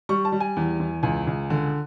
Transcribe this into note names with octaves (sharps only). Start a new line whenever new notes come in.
G3 C#6
A5
G3
G#5
E2
E2
C#2 G#5
C#2
D3